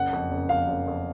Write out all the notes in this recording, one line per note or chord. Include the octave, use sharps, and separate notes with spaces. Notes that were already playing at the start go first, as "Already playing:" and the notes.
Already playing: F#1 F#5
F2
F#1
F2 F5
F#1
F2